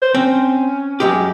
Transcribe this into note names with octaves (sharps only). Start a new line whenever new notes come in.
C5
C4 C#4
F#2 G#3 G4